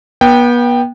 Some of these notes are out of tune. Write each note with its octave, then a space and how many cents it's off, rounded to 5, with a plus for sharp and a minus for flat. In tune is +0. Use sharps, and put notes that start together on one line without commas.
B3 -35 G5 +0